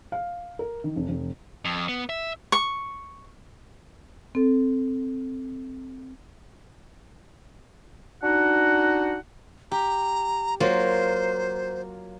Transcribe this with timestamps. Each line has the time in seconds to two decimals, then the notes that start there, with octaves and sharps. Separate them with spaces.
0.12 F5
0.59 A#4
0.84 D#3
0.96 F1
1.09 F1
1.65 F2
1.89 B3
2.09 E5
2.52 C#6
4.35 C4 A4
8.23 D4 D#4 F#4 F#5
9.72 G4 A#5
10.60 F#3 A#3 F4 C5